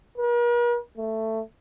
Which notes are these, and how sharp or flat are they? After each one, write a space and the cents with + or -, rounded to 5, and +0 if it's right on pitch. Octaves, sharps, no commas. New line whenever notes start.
A#4 +45
A3 +10